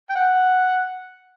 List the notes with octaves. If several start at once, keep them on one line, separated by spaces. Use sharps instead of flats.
G5
F#5